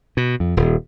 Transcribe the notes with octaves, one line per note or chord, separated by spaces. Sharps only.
B2
F2
D#1